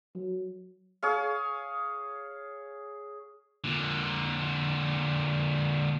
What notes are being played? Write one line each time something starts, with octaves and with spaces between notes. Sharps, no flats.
F#3
G#4 C#5 F5
A#2 D3